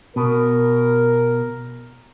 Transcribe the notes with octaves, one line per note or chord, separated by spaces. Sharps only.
B2 A#4